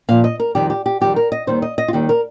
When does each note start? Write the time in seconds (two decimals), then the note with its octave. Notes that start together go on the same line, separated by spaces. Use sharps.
0.09 A#2 F3 F5
0.24 D#5
0.40 A#4
0.55 F2 D#3 G3 G4
0.70 G4
0.86 G4
1.01 F2 D#3 G3 G4
1.16 A#4
1.32 D#5
1.47 D#2 D#3 G3 C5
1.62 D#5
1.78 D#5
1.88 F4
1.93 D#2 D#3 G3 G4
2.09 A#4